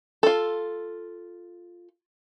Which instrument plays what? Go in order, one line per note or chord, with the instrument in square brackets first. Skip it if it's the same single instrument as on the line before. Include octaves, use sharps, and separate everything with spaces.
[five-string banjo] F4 A4